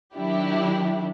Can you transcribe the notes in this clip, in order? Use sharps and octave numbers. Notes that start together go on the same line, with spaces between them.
D#3 F#3 D4 E4 G4